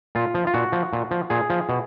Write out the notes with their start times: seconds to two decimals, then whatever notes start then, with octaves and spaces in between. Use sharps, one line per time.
0.15 A#2 F4
0.35 F3
0.47 F4
0.54 A#2 F#4
0.72 F3
0.93 A#2
1.11 F3
1.30 A#2 G#4
1.50 F3
1.69 B2